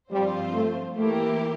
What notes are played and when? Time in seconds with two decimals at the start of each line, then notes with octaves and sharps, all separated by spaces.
0.11 G2 F3 G3 C4 F4 C5
0.54 A3
0.95 E3 A3 A#3 E4 G4 A#4